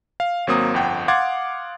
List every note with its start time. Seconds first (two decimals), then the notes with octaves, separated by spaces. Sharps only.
0.20 F5
0.47 G#1 F#3 A#3 C4 D#6
0.74 G1 F2 F#5 G5
1.08 F5 F#5 C6 D6 G#6 A6